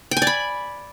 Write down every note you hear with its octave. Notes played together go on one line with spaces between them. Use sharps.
G5
G#5
D5
B5